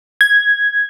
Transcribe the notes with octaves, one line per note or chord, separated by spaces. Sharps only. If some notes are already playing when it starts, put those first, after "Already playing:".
G#6